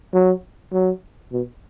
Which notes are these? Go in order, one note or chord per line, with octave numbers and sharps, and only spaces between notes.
F#3
F#3
B2